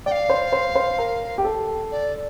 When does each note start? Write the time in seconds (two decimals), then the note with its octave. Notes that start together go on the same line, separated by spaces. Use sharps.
0.06 D5 G5
0.11 F5
0.30 C5
0.52 C5
0.75 C5
0.99 A#4
1.38 G4
1.45 A4
1.91 D5